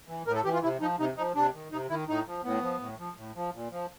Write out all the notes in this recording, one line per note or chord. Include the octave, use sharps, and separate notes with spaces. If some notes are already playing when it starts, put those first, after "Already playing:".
E3
A2 A#4
A4
E3 G4
F4
C3 E4
F3 D#4
C3 D#4
F3 D#4
C3 D4
D#3
C3 D#4
D#3 E4
A2 D#4
F3
A2 B3
F3
A2
F3
A2
F3
A#2
F3